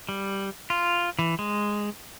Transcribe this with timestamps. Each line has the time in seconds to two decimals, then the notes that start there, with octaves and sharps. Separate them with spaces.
0.09 G3
0.70 F4
1.19 E3
1.39 G#3